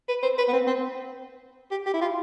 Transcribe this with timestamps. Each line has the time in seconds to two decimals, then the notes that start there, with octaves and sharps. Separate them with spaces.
0.08 B4
0.23 C5
0.38 B4
0.48 B3
0.53 C4
0.67 C4
1.71 G4
1.86 G4
1.94 E4
2.01 F4